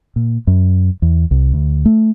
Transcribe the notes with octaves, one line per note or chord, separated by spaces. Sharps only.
A#2
F#2
E2
C2
D2
A3